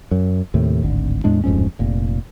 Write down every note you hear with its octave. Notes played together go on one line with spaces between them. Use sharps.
F#2
D#2 A2 C3
D1 G#1 D3
E2 A2 G#3 D4
D1 F2 G#2 C#4
F1 A#2